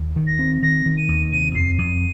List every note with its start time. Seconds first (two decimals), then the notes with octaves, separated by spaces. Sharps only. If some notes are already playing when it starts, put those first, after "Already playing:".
Already playing: D#2
0.16 D#3
0.27 A#6
0.39 C4
0.62 D#3 A#6
0.86 D#3
0.97 D#7
1.08 D#2
1.32 C3 D#7
1.55 F2 C7
1.78 F2 D#7